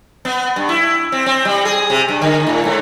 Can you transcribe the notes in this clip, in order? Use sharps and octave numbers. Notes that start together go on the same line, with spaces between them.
B3
G2
E4
C4
C4
G3
G#4
C3
G2
D3
A2
G#2